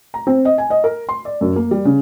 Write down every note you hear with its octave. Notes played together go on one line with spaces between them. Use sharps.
A#5
C4
D#5
G#5
D#5
A#4
C6
D5
F#2
A#3
G3
C#3